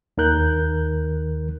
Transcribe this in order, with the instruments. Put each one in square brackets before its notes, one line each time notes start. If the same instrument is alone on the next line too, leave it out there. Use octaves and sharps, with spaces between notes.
[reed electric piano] D#2 D#3 A#4 F#6 G6